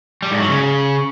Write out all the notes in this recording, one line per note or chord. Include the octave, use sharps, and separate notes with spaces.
G3
G#2
F#3
C#3